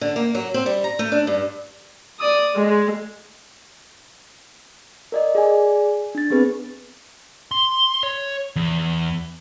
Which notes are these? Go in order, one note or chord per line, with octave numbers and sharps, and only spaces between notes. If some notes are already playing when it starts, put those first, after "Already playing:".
D3
A#3
F#3
C4
G3
A#5
A3
D4
G2
D5 D#6
G#3
A#4 D5 D#5
G#4 D5 G#5
D4 A6
B3 C4 G#4 B4
C6
C#5
E2